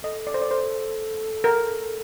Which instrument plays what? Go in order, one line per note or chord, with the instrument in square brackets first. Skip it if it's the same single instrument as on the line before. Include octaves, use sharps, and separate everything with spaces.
[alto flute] A4 [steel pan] D#5
[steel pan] D5
C5
D5
C5
A#4